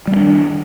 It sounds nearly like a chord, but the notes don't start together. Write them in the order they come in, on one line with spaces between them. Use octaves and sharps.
G3 B3 D4 D#3